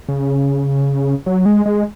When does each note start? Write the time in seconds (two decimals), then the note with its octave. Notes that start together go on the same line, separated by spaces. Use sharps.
0.09 C#3
1.26 F#3
1.46 G#3
1.66 G#3